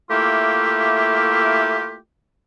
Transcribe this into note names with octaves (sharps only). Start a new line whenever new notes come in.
A3 A#3 E4 F4 G4